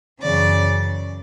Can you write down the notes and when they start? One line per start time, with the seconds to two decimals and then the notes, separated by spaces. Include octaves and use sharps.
0.21 F#2 C#3 E3 D5